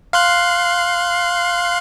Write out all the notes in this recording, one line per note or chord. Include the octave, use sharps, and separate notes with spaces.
F5 C6 F#6